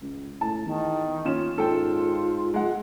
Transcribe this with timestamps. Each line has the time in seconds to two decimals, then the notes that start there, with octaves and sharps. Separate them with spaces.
0.02 C#2
0.41 A2 A5
0.66 E2 D#3
1.25 D#2 C#4 F4 E7
1.58 G#2 F4 A4 G5
2.54 G#3 F#5